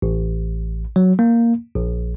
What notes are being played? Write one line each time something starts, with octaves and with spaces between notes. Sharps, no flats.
A1
F#3
A#3
A#1